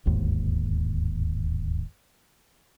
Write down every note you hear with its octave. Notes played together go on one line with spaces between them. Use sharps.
D1 G1 D#2 G#2